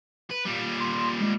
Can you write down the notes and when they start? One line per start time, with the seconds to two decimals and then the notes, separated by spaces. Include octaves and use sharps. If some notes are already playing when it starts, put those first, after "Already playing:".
0.30 B4
0.45 A#2 G3
0.80 C6
1.20 G#3